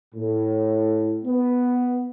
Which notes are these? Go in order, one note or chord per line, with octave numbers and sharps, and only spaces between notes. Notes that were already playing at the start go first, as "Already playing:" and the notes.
A2
B3